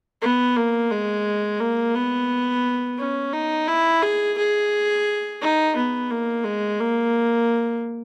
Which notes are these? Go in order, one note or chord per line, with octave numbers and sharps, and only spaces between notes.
B3
A#3
G#3
A#3
B3
C#4
D#4
E4
G#4
G#4
D#4
B3
A#3
G#3
A#3